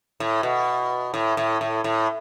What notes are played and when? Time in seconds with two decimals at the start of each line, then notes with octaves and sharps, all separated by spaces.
0.20 A2
0.43 B2
1.14 A2
1.37 A2
1.61 A2
1.84 A2